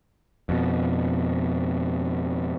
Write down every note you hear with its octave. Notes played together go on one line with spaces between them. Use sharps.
F2 B2